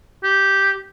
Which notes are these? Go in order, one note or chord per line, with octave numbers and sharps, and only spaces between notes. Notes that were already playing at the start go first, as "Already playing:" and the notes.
G4